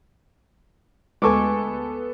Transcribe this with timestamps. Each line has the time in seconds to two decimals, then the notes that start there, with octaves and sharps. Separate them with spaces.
1.22 D2 G#3 B3 A4 G#5 C#6 D6